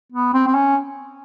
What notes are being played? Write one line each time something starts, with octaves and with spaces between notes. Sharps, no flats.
B3
C4
C4
C#4